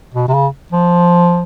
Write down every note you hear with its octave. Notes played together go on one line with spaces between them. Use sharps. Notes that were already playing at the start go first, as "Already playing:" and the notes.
B2
C3
C#3
F3